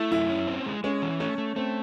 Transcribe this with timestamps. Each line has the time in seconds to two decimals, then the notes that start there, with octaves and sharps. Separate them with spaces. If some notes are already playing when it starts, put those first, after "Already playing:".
Already playing: A3 E4
0.11 F#2 E4
0.29 C#4
0.47 C4
0.66 G#3
0.84 G#3 C#4
1.02 E3
1.20 A3 C#4
1.38 A3
1.56 A3 C4